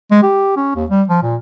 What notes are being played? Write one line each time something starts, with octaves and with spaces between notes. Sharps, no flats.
G#3
G4
C#4
D#2
G3
F3
A#2